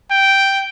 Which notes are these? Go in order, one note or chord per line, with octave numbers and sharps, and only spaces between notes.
G5